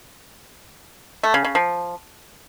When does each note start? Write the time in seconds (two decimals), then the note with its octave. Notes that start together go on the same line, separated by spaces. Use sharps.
1.23 A3
1.34 C#3
1.44 C#3
1.55 F3